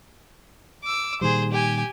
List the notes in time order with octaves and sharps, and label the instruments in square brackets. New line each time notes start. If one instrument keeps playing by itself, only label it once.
[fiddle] D6 E6
[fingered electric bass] A#2 D#3 G3 [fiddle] G#4 C5
[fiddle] G4 G#5